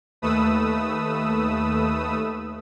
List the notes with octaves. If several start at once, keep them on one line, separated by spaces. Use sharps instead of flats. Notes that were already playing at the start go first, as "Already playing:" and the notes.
D#2 A3 B4 D#6 E6